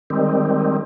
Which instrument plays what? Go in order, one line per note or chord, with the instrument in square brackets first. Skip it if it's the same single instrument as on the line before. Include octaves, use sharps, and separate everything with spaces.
[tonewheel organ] D#3 G3 G#3 C4